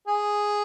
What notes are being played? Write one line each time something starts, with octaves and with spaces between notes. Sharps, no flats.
G#4